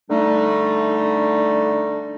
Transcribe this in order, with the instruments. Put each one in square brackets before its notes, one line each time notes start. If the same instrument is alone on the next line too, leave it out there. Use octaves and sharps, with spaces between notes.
[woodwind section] D3 G3 A3 D4 D#4